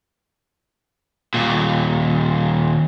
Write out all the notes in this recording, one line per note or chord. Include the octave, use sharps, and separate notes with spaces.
D#2 A#2